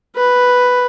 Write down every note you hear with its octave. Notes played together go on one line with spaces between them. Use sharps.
B4